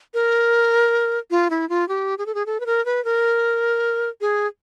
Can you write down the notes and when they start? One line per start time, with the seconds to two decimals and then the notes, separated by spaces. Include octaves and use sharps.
0.14 A#4
1.31 F4
1.50 E4
1.69 F4
1.89 G4
2.18 G#4
2.26 A4
2.35 G#4
2.46 A4
2.60 B4
2.66 A#4
2.86 B4
3.05 A#4
4.21 G#4